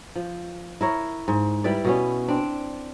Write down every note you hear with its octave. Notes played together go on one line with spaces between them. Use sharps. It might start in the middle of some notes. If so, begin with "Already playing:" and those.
F3
E4 A#4 C#5
G#2
G3 E4 B4 D5
B2 B3 C#4
C4 D4